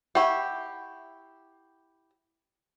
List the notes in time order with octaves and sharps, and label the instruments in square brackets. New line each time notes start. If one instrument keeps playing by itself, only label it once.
[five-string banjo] E4 G4 [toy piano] F#5 C#6